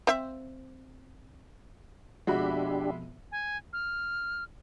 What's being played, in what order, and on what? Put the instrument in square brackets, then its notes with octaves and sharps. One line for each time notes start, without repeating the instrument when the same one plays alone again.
[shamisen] C4 E5
[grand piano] F2 B2 [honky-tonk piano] G#3 E5 B5 [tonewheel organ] D4 G4 [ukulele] F#4
[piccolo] G#5
F6